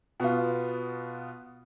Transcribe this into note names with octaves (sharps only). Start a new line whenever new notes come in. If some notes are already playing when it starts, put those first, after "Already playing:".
B2 B3 F4